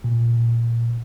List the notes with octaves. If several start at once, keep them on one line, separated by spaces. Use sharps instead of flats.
A#2